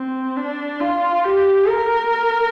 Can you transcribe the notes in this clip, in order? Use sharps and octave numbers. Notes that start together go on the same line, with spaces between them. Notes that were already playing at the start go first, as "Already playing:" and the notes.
Already playing: C4
D4
F4
G4
A#4